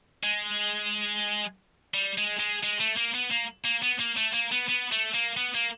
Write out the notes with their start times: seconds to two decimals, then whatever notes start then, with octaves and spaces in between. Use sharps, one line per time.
0.23 G#3
1.94 G3
2.18 G#3
2.39 G#3
2.63 G#3
2.80 A3
2.97 A#3
3.15 B3
3.31 A#3
3.65 A#3
3.83 B3
4.00 A#3
4.17 A3
4.34 A#3
4.52 B3
4.69 B3
4.92 A3
5.14 A#3
5.37 B3
5.55 A#3